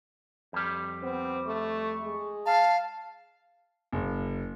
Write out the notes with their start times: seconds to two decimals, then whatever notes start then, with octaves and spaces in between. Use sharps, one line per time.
0.53 F2 G3
1.03 B3 C4
1.47 A3 C#6
2.03 G#3
2.46 F5 A5
3.92 F#1